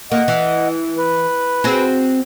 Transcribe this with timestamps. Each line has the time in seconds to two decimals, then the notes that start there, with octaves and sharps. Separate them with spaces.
0.12 A#3 D#5 F#5
0.28 E3
0.98 B4
1.64 C4 F#4 G#4